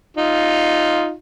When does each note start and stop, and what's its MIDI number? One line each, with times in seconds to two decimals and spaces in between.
0.17 1.13 63
0.17 1.13 65